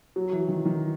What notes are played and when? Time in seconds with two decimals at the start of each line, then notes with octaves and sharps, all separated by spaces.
0.16 F#3
0.33 E3
0.48 D#3
0.65 D#3